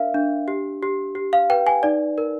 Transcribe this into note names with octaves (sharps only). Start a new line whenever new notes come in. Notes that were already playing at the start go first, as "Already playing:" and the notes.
Already playing: D4 A#4 E5 F5
D4
G4
G4
G4
F5
B4 G5
G#5
D#4 D5
A#4